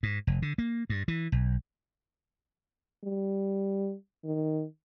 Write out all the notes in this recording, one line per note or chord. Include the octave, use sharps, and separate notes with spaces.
G#2
F1
D3
A#3
G2
E3
B1
G3
D#3